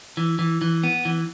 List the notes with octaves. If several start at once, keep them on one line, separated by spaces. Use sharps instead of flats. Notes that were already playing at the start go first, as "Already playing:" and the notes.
E3
E3
E3
B3
E3